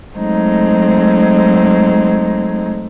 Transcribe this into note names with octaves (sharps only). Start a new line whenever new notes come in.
F#3 G#3 A3 C4 D#4